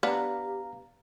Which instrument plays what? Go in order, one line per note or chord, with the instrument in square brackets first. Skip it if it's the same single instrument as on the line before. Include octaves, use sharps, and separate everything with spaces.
[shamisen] B3 D4 [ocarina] G4 [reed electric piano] F5 A#5